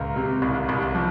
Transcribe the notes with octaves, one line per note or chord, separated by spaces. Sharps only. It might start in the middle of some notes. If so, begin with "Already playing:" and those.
Already playing: C#2 A#4
C3
C2
C2
F3